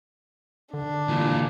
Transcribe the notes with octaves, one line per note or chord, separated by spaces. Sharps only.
D3 D4
A#2 E3